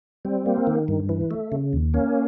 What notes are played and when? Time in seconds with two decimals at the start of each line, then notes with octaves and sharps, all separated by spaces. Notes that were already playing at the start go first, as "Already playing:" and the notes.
0.25 G3 C4
0.46 A#3
0.67 D#3
0.88 G2
1.09 E3
1.31 A3
1.52 C#3
1.73 D#2
1.94 A#3 C#4